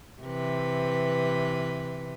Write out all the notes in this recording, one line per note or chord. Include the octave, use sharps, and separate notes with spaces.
C3 E3 B4